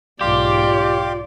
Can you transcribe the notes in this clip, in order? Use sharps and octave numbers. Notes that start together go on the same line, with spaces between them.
B1 G#2 F4 G4 D5 F5 C6 D6